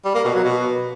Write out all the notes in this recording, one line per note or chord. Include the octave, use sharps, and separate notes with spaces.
G3
A#3
B2
F#3
B2